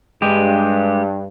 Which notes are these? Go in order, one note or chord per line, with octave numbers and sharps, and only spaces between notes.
G2 G#3 G4